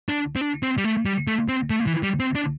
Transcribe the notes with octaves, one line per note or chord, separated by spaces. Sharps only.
D4
C4
D4
C4
G3
A3
G3
A3
C4
A3
E3
G3
C4
D4